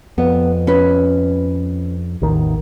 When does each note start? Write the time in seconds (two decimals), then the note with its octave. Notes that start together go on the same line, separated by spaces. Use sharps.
0.18 F2 B3
0.67 C#4 B4
2.21 A1 E2 D#3